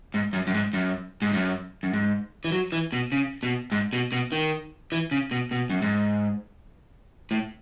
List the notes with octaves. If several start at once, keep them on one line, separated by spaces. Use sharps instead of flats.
G#2
F#2
F#2
G#2
F#2
G#2
F#2
F#2
G#2
E3
F#3
E3
B2
C#3
B2
G#2
B2
B2
D#3
E3
C#3
B2
B2
F#2
G#2
A2